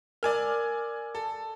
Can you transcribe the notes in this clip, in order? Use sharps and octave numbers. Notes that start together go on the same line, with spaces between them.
A#4 D5 G#5 F6
A4